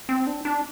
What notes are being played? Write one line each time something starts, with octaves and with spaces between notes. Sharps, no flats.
C4
D4
D4